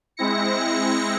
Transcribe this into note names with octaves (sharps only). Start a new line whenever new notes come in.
G#3 C4 E4 A#6 C#7